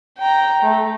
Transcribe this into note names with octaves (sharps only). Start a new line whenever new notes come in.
G5 A#5
A3